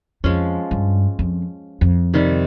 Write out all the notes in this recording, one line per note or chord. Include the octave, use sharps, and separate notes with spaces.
F2 F3 G#3 C#4
G2
F2
F2
C3 D#3 G3